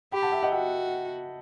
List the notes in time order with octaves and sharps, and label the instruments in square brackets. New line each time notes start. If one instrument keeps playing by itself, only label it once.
[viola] G4 [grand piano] G5 B5
[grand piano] F#5 A5
E5 G5
D#5 F#5
[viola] F#4 [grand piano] E5 G5